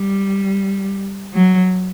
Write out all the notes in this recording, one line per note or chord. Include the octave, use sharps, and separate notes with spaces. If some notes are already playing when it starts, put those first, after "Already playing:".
Already playing: G3
F#3